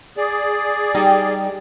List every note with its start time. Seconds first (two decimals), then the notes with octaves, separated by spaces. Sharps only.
0.17 G#4 D5
0.94 G3 D#4 G4